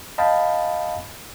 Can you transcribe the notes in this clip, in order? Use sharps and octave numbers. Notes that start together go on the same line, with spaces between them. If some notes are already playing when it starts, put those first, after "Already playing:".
D#5 F5 G5 A5 B5